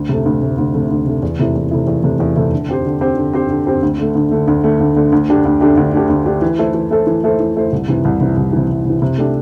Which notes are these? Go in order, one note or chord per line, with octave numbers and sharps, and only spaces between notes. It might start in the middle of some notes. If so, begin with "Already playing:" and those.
Already playing: D2
C3 A3
D2
C3 A3
D2
C3 A3
D2
C3 A3
E2
C3 A3 E4
E2
C3 A3 E4
E2
C3 A3 E4
E2
C3 A3 E4
D3
C4 G4 C5
D3
C4 G4 C5
D3
C4 G4 C5
D3
C4 G4 C5
D2
D3 A3
D2
D3 A3
D2
D3 A3
D2
D3 A3
D2
D3 A3 D4 G4
D2
D3 A3 D4 G4
D2
D3 A3 D4 G4
D2
D3 A3 D4 G4
E3
A3 E4 A4 C5
E3
A3 E4 A4 C5
E3
A3 E4 A4 C5
E3
A3 E4 A4 C5
C2
C3 E3
C2
C3 E3
C2
C3 E3
C2
C3 E3
C3
A3 D4 G4